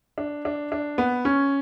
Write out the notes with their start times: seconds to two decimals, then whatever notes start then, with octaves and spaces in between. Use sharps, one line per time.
0.18 D4
0.45 D4
0.72 D4
0.98 B3
1.25 C#4